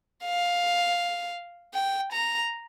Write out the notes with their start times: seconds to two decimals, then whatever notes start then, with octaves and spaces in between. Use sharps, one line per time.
0.24 F5
1.74 G5
2.12 A#5